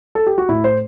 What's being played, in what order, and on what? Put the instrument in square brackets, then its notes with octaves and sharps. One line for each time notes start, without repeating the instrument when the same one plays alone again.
[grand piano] A4
G4
F#4
A2 E4
C5